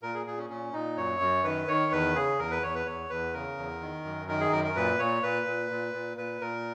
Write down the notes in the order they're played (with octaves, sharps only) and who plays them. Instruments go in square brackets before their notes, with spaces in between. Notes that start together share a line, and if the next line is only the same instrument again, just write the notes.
[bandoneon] A#2 A#4
G#4
A#2 G#4
C#4
A#2 C#4
A#2 D#4
F#2 C#5
F#2
D#3 B4
D#3 C#5
E2 B4
C#3 G#4
E2 A#4
B4
E2 C#5
B4
E2 C#5
E2 B4
C#3 A#4
E2
D#3
F#2
D#3 A#4
G#4
F#2 A#4
A#4
A#2 B4
A#2 C#5
A#2 B4
A#2
A#2
A#2
A#2 B4
A#2 A#4